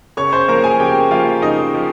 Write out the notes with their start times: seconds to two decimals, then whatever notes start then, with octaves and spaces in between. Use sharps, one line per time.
0.17 C#3 C#5 C#6
0.33 C5 C6
0.48 F3 A#3 A#4 A#5
0.64 G#4 G#5
0.80 C#3 G4 G5
1.11 F3 A#3 F4 F5
1.42 C#3 D#4 D#5
1.74 F3